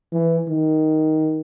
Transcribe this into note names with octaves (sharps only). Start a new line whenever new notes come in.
E3
D#3